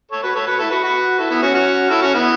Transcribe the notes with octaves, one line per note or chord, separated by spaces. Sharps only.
A4 C#5
F#4 B4
A4 C#5
F#4 B4
E4 A4
F#4 B4
F#4 B4
E4 A4
B3 E4
C#4 F#4
C#4 F#4
E4 A4
C#4 F#4
B3 E4